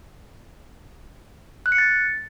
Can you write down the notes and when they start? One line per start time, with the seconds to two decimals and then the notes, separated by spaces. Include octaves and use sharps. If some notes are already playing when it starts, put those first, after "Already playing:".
1.66 F#6
1.72 C#7
1.78 A6